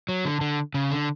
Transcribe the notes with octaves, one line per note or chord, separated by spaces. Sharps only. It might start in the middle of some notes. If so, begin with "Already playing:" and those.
F#3
D3
D3
C#3
D3